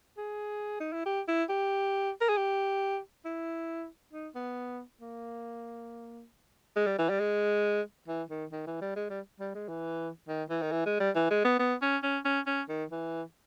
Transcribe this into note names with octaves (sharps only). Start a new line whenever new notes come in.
G#4
D#4
E4
G4
E4
G4
A#4
G#4
G4
E4
D#4
B3
A#3
G#3
G3
E3
G3
G#3
E3
D#3
D#3
E3
G3
G#3
G3
G3
G#3
E3
D#3
E3
D#3
E3
G#3
G3
E3
G#3
B3
B3
C#4
C#4
C#4
C#4
D#3
E3